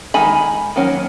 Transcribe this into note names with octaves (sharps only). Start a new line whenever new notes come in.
D#3 G#3 D#4 G#5 B5
D#3 F#3 A#3 C#4